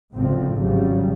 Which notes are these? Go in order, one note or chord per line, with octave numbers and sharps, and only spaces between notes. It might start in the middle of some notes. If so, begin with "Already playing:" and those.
G#1 C#2 A2 D3 F3 C4
G#1 C#3 F#3 G3